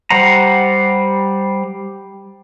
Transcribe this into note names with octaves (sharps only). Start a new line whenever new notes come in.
G3 C5 F#5 A#5